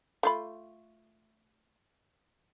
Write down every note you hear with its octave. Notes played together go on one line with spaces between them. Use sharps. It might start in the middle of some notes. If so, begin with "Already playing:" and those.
A3 F4 B5